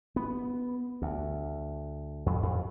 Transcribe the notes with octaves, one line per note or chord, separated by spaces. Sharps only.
B3
D2
F2
F2